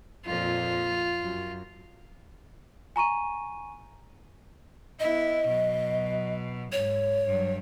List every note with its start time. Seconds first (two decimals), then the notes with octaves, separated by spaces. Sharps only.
0.26 F2 A#2 F4
1.26 F#2
2.96 G#5 A#5 C#6 D#7
5.00 B3 E4 D#5
5.48 B2 F#3
6.72 G#2 C#5
7.25 G2 F#3